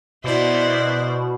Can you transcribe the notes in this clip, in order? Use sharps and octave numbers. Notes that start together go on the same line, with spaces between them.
B2 E4 C5 D5